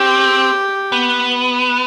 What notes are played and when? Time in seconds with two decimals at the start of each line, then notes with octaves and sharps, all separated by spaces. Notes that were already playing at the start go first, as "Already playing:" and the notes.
Already playing: C4 G4
0.92 B3